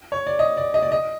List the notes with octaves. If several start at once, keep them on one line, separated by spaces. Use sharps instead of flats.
C#5
D5
D#5
D5
D#5
D5
D#5